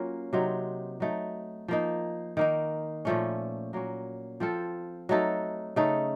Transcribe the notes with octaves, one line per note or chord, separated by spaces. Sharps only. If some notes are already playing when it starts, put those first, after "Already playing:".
Already playing: F#3 A#3 C#4 F4
C3 F#3 C4 D#4
F#3 A3 D#4
F3 A#3 D#4
D#3 A#3 D#4
A#2 F3 A3 C#4
F#3 A#3 C#4
F3 C4 F4 A4
F#3 A3 D#4 A4
C#3 A3 D#4 A4